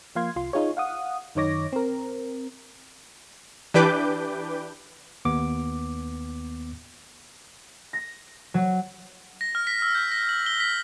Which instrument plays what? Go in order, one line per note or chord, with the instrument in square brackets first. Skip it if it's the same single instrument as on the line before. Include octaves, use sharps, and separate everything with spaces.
[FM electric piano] F3 A#3 F5 C6 G#6
C2 F4 C6
D#4 F4 G#4 C#5
F5 F#5 D#6
F#2 D#3 D#4 C#5 D6 A#6
C4 A#4
[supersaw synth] E3 D4 G4 B4 D6 G6
[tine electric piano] D#2 B3 D6
[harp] A#6
F#3
[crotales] A#6
F6
B6
E6
G6
A#6
F#7
G7
B6